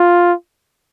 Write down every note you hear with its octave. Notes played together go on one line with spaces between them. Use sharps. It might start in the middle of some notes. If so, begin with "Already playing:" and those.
Already playing: F4